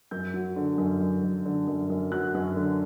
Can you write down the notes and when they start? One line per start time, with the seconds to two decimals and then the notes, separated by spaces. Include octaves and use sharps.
0.11 F#2 G6
0.34 F#3
0.56 D3
0.78 F#2
1.01 F#2
1.23 F#2
1.45 D3
1.67 F#2
1.90 F#2
2.12 F#3 F#6
2.35 F#2
2.56 D3